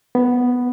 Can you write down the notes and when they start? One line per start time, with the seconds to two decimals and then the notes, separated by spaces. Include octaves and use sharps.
0.15 B3